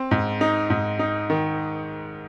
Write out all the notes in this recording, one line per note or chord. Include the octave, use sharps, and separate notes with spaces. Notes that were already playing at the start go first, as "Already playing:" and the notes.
Already playing: C4
G#2
D#4
G#2
D#4
D#3